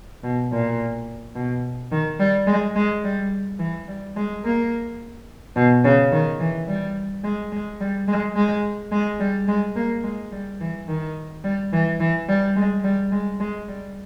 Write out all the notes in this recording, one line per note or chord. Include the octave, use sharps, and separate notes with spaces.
B2
A#2
B2
D#3
G3
G#3
G#3
G3
E3
G3
G#3
A#3
B2
C#3
D#3
E3
G3
G#3
G#3
G3
G#3
G#3
G#3
G3
G#3
A#3
G#3
G3
E3
D#3
G3
E3
E3
G3
G#3
G3
G#3
G#3
G3